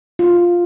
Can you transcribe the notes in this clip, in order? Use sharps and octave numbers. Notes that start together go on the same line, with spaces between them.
F4